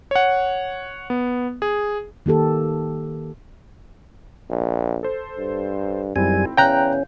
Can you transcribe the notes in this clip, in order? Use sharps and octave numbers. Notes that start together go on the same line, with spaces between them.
C#5 F#5
B3
G#4
D#3 A#3 G4 A4
A#1
A4 C5
G2
G#1 F#2 G3 C4 E4 G#5
E2 C#4 F5 G5 A#5 F#6 G6